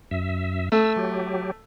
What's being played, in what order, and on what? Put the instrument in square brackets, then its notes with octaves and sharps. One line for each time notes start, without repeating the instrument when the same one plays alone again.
[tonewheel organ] F#2 E5
[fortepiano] A3 [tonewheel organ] E6
[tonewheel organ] F#3 G4